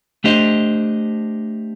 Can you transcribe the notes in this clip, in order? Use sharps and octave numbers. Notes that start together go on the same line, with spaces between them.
A3 D4 G4 C5 D#5